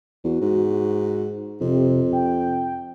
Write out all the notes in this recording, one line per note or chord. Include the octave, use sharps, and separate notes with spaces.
E2 F#4
G#2
F2 C3
G5